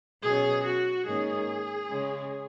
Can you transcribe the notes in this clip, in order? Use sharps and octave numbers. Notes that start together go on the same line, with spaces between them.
B2 F#3 C#4 G#4
F#4
G#2 D#3 A#3 C#4 G#4
C#3 G#3 C#4